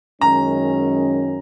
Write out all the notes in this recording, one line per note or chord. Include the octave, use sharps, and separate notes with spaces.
F#2 D#3 G#3 C#4 A#5